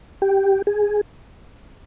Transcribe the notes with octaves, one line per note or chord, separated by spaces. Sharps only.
G4
G#4